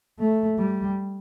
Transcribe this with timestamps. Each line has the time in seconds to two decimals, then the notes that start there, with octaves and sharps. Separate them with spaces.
0.20 A3
0.59 G3